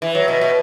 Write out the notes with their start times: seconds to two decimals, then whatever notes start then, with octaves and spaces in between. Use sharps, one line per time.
0.02 E3
0.15 F#3
0.28 B2
0.41 B2